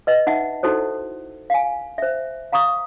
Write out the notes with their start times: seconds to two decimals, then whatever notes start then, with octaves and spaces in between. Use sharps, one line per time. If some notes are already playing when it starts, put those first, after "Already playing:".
0.07 B4 D#5
0.27 D#4 E5 F#5 A5
0.63 D#4 E4 F#4 A4 C5
1.50 F5 G#5
1.98 C5 E5
2.52 F5 A#5 C#6 D#6